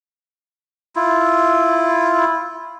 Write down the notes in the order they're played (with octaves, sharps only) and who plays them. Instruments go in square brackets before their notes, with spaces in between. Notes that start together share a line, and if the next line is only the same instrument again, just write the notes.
[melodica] E4 F4